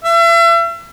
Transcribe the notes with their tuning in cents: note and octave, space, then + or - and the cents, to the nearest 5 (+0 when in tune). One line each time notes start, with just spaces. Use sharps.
E5 +40